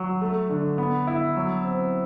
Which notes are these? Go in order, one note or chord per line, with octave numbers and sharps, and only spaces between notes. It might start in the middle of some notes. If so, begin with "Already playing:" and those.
Already playing: F#3
A3
D3
B3
E4
F#3
C4